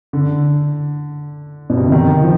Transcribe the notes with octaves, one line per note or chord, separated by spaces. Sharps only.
D3
B2
C3
D3
D#3
F3